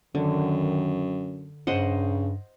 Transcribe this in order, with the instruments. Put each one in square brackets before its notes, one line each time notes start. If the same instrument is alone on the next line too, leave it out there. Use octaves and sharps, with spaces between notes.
[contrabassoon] F#2 [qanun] D3 [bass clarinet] D#3
[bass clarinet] G2 [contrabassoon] C#3 [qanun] C5 D#5 F#5